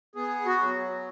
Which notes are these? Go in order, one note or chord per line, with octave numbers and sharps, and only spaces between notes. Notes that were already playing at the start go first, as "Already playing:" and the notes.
B3 G#4
F#4
F#3